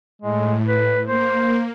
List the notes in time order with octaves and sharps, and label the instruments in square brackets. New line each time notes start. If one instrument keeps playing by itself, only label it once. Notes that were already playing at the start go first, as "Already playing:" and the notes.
[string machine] A2 [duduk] G#3
[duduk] B4
[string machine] A#3 [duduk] C5